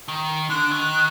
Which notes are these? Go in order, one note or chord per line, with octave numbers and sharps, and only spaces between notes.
D#3
D3 F#6
D#3